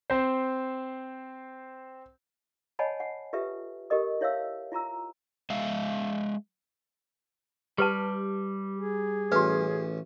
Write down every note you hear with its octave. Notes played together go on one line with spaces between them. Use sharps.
C4 C5
C#5 D#5 F#5 G#5 A5 B5
F#5
F4 G4 A4 B4 E5
G4 A4 A#4 D#5 D#6
E4 C#5 E5 F5 E6
E4 F4 A#5 E6
G#3 E5 F5
G3 G4 B4 A5
G#4
A1 C#4 F#4 B4